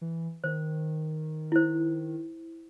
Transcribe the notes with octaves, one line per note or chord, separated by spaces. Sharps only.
E3
D#3 C5
E4 C5